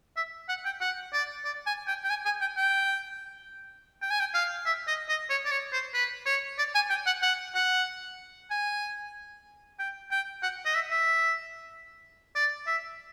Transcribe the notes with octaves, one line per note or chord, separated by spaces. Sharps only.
E5
F#5
G5
F#5
D5
D5
G#5
G5
G5
G#5
G#5
G5
G5
G5
G#5
G5
F5
E5
D#5
D#5
C#5
D5
C#5
C5
B4
C#5
D5
G#5
G5
F#5
F#5
F#5
G#5
G5
G5
F#5
D#5
E5
E5
D5
E5